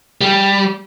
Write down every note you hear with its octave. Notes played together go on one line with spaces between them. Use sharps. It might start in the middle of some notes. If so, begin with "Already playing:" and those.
G3